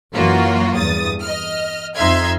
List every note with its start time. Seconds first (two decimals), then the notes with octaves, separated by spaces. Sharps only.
0.14 F#2 E3 F#3 A#3 F4 F#4
0.76 E2 G2 D#6 A6
1.22 D#5 F6
1.97 F2 D#4 E5 C6 F6 G#6